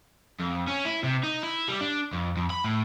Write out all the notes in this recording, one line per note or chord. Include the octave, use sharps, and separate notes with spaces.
F2
C#4
E4
C3
D#4
E4
G3
D4
F2
F2
B5
A2